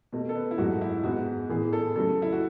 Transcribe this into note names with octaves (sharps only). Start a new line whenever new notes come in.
B2 A3
A4
B4
E4
G#2 F#3 A3 F#4
E4
G#2 G#3 B3 F#4
A2 E3 B3 G#4
A4
C#3 F#3 A3 A4
E4
F#4